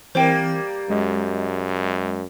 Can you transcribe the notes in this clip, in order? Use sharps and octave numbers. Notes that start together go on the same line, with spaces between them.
E3 G3 A#3 C4 A#4 C5 G5
F#2 G#3 D#5